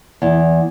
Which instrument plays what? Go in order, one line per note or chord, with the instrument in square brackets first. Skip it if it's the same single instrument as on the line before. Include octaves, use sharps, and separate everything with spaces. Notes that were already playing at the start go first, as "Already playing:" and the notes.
[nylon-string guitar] E2